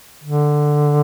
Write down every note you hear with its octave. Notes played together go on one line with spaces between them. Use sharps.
D3